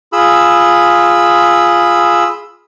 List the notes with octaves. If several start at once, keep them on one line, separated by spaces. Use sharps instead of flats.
F4 G#4 B5 E6